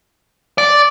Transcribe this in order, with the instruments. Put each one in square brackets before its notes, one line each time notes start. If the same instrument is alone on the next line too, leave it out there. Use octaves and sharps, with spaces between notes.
[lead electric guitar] D5